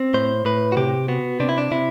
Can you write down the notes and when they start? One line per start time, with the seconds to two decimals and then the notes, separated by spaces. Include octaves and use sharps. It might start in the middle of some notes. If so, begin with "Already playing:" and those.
Already playing: C4
0.14 A2 C5
0.45 A2 B4
0.72 F#4
0.77 C3 G4
1.08 B3 F#4
1.40 C3 D4
1.49 E4
1.58 D4
1.71 C3 E4